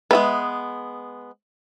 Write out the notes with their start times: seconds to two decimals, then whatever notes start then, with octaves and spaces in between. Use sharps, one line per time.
0.11 G#3 B3 B4 E5